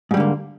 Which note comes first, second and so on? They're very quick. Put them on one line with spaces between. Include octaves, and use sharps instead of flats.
G#2 G3 D3 A#3